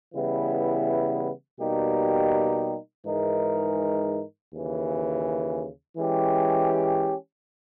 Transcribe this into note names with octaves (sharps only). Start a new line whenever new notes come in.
C#3 E3 G3 B3 E4
B2 G3 A#3 D#4 G4
G#2 E3 G#3 D#4 A#4
D#2 C#3 E3
E3 G#3 C#4 G4